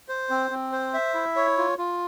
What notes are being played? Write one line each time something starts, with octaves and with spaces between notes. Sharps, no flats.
C5
C4
C4
C5
E5
E4
C#5
F4
F4